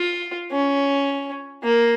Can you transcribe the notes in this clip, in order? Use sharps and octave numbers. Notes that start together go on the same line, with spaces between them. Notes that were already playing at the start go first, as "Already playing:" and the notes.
Already playing: F4
C#4
A#3